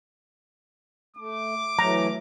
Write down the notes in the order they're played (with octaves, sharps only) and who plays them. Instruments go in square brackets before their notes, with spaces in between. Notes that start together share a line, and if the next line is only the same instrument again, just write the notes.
[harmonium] A3 [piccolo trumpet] D6
[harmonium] E3 F#3 A3 [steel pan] A#5